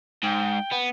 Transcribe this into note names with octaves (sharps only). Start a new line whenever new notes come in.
G#2 G5
B3